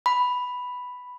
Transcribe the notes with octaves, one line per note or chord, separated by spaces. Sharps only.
B5